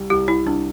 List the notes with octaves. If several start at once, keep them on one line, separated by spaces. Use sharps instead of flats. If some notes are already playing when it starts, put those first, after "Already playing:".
Already playing: C2 G3
C2 G4
E4
C2 D4